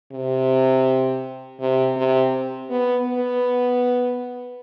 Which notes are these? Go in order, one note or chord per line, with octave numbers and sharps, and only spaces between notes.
C3
C3
C3
B3
B3